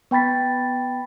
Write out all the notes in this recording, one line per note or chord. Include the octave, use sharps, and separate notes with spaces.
B3 G5 B5 A6 B6